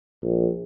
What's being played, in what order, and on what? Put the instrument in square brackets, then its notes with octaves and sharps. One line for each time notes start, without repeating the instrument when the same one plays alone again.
[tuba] A#1